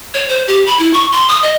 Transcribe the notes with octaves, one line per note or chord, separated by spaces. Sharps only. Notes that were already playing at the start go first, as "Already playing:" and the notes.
C#5
C5
G4
B5
E4
C#6
C6
D#6
D#5